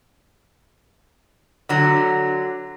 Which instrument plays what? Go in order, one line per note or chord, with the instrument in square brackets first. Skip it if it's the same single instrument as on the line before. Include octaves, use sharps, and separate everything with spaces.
[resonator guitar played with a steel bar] D3 F#3